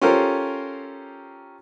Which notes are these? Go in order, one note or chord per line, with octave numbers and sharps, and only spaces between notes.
C#4 F4 G4 A4 A#4 C5